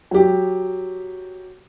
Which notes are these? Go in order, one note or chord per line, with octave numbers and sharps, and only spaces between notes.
F#3 G4